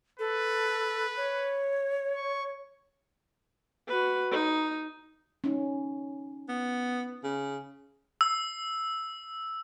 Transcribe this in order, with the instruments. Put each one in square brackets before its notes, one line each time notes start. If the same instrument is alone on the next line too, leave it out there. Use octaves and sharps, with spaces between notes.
[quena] A4 [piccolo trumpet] B4
[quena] C#5
[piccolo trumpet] C#6
[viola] F#4 B4
D#4
[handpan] C#4 D#4
[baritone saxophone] B3
C#3
[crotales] E6